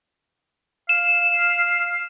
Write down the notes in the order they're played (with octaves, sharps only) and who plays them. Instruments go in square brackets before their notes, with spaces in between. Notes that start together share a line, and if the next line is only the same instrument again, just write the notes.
[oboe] F5 [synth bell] E7